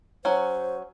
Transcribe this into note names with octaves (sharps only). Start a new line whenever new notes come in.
F#3 C#4 C5